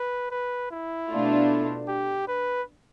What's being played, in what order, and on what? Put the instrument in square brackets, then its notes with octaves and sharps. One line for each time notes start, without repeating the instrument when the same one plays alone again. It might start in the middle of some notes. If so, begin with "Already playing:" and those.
Already playing: [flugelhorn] B4
B4
E4
[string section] B2 A3 D4 F4
[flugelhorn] G4
B4